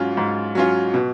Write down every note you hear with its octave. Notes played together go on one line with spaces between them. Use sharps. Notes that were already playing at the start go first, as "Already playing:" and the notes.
Already playing: G#2 F#3 C#4 F4
G#2
F#3 C#4 F4
B2